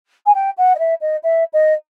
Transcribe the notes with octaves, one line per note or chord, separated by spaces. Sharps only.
G#5
G5
F#5
D#5
E5
D#5
E5
D#5